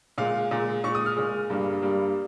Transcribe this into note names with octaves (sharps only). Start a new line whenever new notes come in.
A#2 G#3 F5
A#2 G#3
A#2 G#3 C#6
D#6
F6
A#2 G#3
G2 G3 A#3
G2 G3 A#3